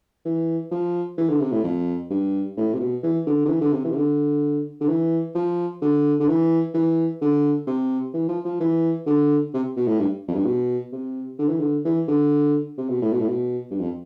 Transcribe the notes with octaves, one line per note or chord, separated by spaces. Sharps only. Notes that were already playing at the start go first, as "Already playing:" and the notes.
E3
F3
E3
D3
C3
A2
F2
G2
A2
C3
B2
E3
D3
D3
E3
D3
C3
E3
C3
D3
D3
E3
F3
D3
D3
E3
E3
D3
C3
E3
F3
F3
E3
D3
C3
B2
A2
G2
F2
G2
B2
C3
D3
E3
D3
E3
D3
C3
B2
A2
B2
A2
B2
G2
F2